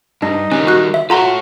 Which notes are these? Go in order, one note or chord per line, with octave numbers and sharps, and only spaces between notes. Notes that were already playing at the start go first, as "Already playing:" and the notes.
G2 D4 D#4
D#3 G3 C#4
F#4 F#6
E5
F4 F#4 A4 C#5 A#5 C6